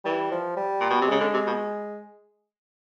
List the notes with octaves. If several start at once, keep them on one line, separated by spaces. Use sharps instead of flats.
E3 G3
F3
G3
A#2
B2
C3
C#3 G#3
D3
C3
B2